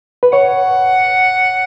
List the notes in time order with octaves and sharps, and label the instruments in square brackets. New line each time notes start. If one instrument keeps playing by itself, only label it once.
[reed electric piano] B4
[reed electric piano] C#5 [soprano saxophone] F#5